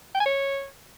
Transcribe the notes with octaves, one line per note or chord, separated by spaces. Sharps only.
G5
G#5
C#5